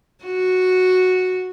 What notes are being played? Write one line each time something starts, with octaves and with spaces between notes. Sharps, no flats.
F#4